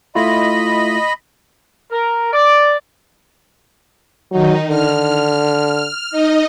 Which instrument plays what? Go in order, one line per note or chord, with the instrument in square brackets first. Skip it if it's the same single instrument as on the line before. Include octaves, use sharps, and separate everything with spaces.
[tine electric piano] A3 E4 F4 [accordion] D#5 B5
[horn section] A#4
D5
[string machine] D#3 D#4 [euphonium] F#3
[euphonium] D3 [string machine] F6
[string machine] D#4 D#5